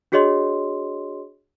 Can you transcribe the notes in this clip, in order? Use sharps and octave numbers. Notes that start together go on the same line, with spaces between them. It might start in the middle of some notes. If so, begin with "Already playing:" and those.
D4 F#4 G#4 C#5 D#5 C6